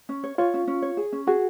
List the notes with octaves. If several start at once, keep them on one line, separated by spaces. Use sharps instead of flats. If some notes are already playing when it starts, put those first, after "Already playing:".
C#4
C#5
F4 C#5
C#4
C#4
C#5
G#4
C#4
F#4 G#4